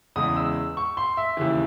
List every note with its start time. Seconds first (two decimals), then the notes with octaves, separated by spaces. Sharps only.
0.16 E2 C#3 E3 G#3 D#6
0.36 E6
0.77 C#6
0.97 C6
1.17 E5
1.37 D#2 C#3 E3